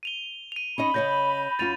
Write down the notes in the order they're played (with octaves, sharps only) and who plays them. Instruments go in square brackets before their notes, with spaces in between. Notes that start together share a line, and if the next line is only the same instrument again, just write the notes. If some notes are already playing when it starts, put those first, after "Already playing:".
[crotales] D#7 F7 G7
D#7 F7
[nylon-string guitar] C#4 D#4 D#5 [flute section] B5
[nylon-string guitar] C#3 C#5 D#5 [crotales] G6 A#6
[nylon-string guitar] F#2 C#4 F4 [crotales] A6 D#7 F7